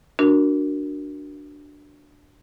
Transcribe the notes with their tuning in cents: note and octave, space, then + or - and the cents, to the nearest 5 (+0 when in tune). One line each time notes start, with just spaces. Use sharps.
D4 +0 F#4 +0 A#4 +0